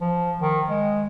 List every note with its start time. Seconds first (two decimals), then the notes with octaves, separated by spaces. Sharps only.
0.01 F3
0.41 D#3
0.70 G#3